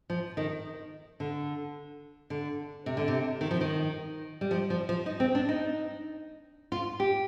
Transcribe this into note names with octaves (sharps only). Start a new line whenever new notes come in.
F3
D#3
D3
D3
C3
D3
C3
D#3
F3
D#3
G3
F3
F3
F3
D#4
C4
D4
D#4
F4
G4